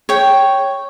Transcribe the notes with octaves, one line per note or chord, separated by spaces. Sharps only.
C#5 G5